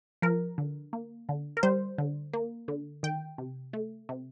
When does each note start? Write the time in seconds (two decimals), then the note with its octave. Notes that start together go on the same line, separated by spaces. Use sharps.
0.22 F3 A#4
0.58 D3
0.93 A#3
1.29 D3
1.57 A#4
1.63 G3 C5
1.98 D3
2.33 A#3
2.68 D3
3.03 D#3 G5
3.38 C3
3.73 A3
4.09 C3